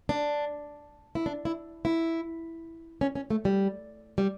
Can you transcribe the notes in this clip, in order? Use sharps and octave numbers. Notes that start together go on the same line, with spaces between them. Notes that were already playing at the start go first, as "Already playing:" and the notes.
D4
E4
D4
E4
E4
C#4
C#4
A3
G3
G3